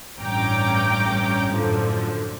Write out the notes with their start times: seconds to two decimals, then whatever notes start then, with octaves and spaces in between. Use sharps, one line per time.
0.19 A1 G2 C#4 G5 A#5 D6
1.53 F#2 A2 D3 F3